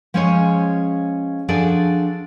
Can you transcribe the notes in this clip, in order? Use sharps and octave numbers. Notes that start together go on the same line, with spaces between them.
F3 G#3 C#4 F4 G#4 C#5
F3 D4 F#4 G#4 A4 D5